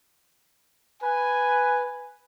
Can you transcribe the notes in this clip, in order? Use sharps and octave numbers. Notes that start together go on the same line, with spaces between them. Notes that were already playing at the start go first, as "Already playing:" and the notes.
B4 G#5